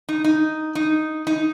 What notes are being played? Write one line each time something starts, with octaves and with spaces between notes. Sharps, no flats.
D#4
D#4
D#4
D#4